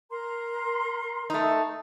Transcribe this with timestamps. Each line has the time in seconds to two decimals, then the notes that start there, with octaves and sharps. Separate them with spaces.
0.11 A#4 A#5 C6
1.30 A3 D#4